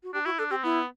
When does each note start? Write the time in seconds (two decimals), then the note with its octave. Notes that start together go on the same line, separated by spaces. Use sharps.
0.03 F#4
0.14 D4 G4
0.25 E4 F#4
0.38 D4 A4
0.50 C4 G4
0.63 B3 E4